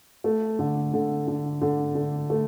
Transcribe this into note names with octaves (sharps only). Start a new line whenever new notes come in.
A3
D3
D3
D3
D3
D3
A3